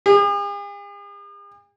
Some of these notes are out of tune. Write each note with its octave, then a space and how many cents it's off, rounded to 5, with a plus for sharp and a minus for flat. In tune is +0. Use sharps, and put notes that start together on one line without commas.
G#4 -45